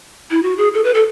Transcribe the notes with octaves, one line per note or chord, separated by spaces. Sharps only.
E4
F#4
G#4
A4
B4
A4